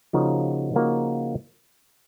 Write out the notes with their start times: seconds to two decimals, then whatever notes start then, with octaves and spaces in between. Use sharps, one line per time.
0.13 C#3 F3 A#3 D#4 F#4
0.74 C#3 F3 A#3 D#4 F#4